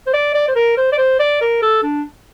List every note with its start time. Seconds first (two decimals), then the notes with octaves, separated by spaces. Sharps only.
0.06 C5
0.14 D5
0.34 D5
0.48 C5
0.55 A#4
0.77 C5
0.92 D5
0.98 C5
1.19 D5
1.41 A#4
1.62 A4
1.83 D4